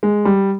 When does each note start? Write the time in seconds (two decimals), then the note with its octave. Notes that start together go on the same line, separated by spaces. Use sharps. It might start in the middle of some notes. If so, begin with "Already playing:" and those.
0.03 G#3
0.25 G3